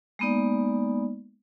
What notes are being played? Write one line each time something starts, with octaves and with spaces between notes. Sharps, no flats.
G#3 A#3 B3 D#4 D5